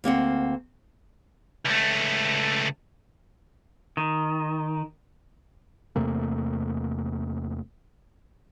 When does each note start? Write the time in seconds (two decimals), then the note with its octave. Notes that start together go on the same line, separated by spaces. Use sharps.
0.04 D2 A#3 C4 F#5
1.66 C#2 A3
3.97 D#3
5.96 E2 C3 A3 A#3